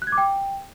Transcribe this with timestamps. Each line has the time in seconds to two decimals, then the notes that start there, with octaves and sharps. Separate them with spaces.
0.02 F#6
0.07 G#6
0.12 D6
0.18 G5